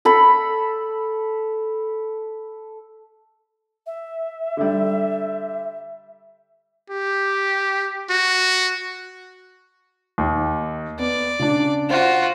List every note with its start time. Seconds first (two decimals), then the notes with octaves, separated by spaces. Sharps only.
0.05 A4 B5
3.86 E5
4.57 D3 G3
6.90 G4
8.10 F#4
10.18 D#2
10.99 B3 D5
11.39 C#3 D4
11.90 F4 F#4 C5